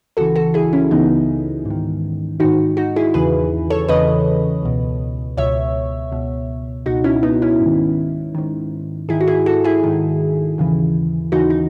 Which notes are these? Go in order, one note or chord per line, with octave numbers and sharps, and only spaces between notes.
C#2 C#3 E3 F#4 A4
F#4 A4
E4 G#4
C#4 E4
C#2 C#3 E3 B3 D#4
G#2 D#3
G#2 D#3 D#4 F#4
D#4 F#4
E4 G#4
E2 C#3 E3 G#4 B4
A4 C#5
E2 C#3 E3 B4 D#5
C#2 B2
C#2 B2 C#5 E5
C#2 B2
C#2 B2 D#4 F#4
C#4 E4
B3 D#4
C#4 E4
G#2
D#3
G#2 D#3
G#2 D#3 E4 G#4
F#4
E4 G#4
F#4 A4
E4 G#4
G#2 D#3
D#2 C#3 E3
D#2 C#3 E3 D#4 F#4
D#4